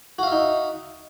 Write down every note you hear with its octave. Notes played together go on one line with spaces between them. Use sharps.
D#4 F#4 E5 F5